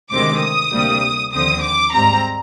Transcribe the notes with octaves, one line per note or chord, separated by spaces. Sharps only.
D2 C3 D#3 G#3 C4 D6
D#6
D2 C3 G3 A#3
D#2 D3 F3 C4 D#6
D6
G#2 G3 C4 A#5